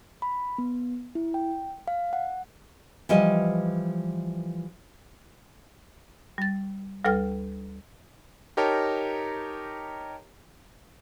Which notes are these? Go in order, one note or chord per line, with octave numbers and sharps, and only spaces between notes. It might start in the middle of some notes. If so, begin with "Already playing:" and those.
B5
B3
E4
G5
F5
F#5
E3 F3 G3 D#5
G3 A6
D2 G3 A4 B4 G5 F6
D#4 G4 A#4 C#5 A5 A#5